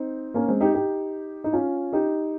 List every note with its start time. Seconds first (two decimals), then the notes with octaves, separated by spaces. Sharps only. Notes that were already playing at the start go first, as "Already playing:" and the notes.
Already playing: C4 D#4
0.34 A#3 C#4
0.48 G#3 C4
0.61 D#4 G4
0.74 D#4 G4
1.44 D#4
1.53 C#4 F4
1.93 D#4 G4